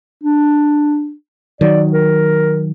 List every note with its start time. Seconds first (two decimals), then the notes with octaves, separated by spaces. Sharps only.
0.23 D4
1.61 D#3 F#3 D5
1.93 A#4